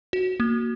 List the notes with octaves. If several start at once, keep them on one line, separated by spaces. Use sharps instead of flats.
F#4
A#3